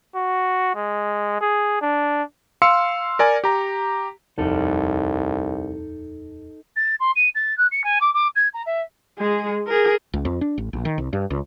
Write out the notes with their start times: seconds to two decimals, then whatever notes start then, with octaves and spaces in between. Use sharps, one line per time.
0.15 F#4
0.75 G#3
1.41 G#4
1.82 D4
2.62 F5 C6 E6 C#7
3.19 A#4 D5 G#5
3.44 G4 A#5
4.38 D#1 C2 F2 D#4 A4
6.76 A6
7.00 C6
7.15 D#7
7.35 A6
7.57 F#6
7.71 C#7
7.84 G#5
8.00 D6
8.14 D6
8.35 G#6
8.53 A#5
8.66 E5
9.19 G#3 G#4
9.67 G#4 A#4
10.14 C#2
10.25 F2
10.41 D4
10.58 A1
10.73 A#1
10.85 D#3
10.98 C2
11.13 G2
11.30 C#2